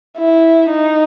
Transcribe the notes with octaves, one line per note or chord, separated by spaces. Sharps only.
E4
D#4